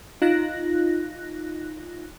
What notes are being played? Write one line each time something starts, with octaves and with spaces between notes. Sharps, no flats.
D#4 F4 F#6 A#6